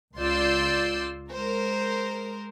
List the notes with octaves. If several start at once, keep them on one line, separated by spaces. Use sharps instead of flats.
C#2 F4 D5 C6 E6 G6
G#3 A#4 C5